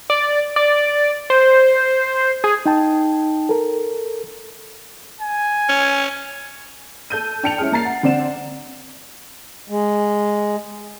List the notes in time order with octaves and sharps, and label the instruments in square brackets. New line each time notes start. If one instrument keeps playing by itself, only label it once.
[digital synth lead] D5
D5
C5
G#4
[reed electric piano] D#4 G5 A5
A4 A#4
[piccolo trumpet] G#5
[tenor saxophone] C#4
[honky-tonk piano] A4 G6 D#7
D4 G5 A5 C#7 D7 F7
G#3 C#4 E4 G#4 F6
A#3 A#5 A6 C7
F#5
D3 C4 D5 F#5 E7
[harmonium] G#3